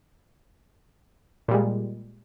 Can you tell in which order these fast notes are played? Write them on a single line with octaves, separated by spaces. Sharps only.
A#2 G3 G#3